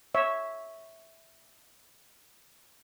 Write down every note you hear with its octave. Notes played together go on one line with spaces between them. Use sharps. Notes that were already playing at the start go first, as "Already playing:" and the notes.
C#5 E5